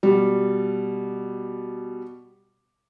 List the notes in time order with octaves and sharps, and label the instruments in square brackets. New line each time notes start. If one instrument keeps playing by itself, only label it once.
[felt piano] B2 G3